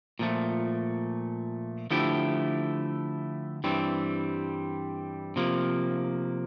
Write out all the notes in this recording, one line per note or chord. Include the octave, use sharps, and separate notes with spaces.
A#2 F3 A3
D3 F3 A3 E4 G4
G2 E3 G3 C4
C3 F3 A#3